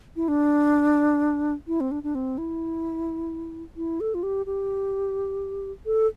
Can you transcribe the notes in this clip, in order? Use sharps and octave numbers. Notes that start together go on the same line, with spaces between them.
E4
D4
E4
C4
D4
D4
C4
E4
E4
A4
F4
G4
G4
A4